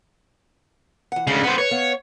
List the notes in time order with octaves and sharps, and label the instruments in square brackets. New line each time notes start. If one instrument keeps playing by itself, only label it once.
[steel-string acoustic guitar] E3 F#5
[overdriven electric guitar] D2 C#3 [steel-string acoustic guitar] G#3 C#4
[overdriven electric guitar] B3 C5 [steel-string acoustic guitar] A4 F#5
[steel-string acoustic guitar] B4 [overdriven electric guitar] C#5
[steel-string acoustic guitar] B3 F5